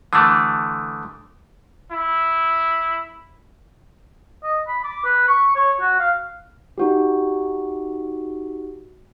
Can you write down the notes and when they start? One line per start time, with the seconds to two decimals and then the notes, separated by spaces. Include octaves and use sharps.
0.13 D3 E3 A3 D6 D#6
1.92 E4
4.43 D#5
4.68 B5
4.84 D6
5.04 B4
5.28 C#6
5.56 C#5
5.80 F#4
5.99 F5
6.78 D#4 F#4 G4